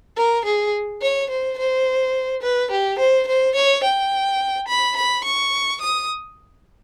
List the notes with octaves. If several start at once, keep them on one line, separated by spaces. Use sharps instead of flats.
A#4
G#4
C#5
C5
C5
B4
G4
C5
C5
C#5
G5
B5
B5
C#6
D#6